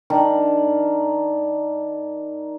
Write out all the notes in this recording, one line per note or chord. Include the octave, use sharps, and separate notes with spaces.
D#3 D4